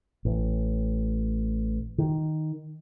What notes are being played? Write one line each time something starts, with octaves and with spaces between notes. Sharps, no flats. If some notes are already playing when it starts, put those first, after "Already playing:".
A1
D#3